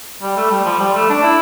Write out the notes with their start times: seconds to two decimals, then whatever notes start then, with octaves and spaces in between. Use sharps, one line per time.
0.22 G3
0.37 A3
0.51 G3
0.65 F3
0.80 G3
0.95 A3
1.09 D4
1.23 E4